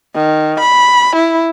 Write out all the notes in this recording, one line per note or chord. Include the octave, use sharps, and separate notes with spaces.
D#3
B5
E4